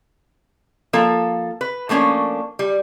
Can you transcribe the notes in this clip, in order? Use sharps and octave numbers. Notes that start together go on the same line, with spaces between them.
F3 A#3 A4
B4
F3 A3 A#3 C#4 D4
G3